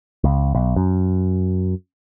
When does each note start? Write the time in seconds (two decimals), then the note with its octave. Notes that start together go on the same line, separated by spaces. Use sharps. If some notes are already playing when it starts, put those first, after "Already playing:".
0.24 C#2
0.55 B1
0.76 F#2